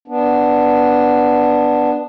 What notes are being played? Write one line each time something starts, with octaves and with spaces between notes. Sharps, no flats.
B3 D4